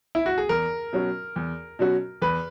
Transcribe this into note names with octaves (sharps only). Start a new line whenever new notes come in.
E4
F#4
G#4
E2 A#4
B2 F#3 C#4 F#4
E2
B2 F#3 C#4 F#4
E2 B4